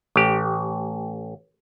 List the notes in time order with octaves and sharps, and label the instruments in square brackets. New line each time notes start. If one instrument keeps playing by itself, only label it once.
[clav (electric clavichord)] A1 G4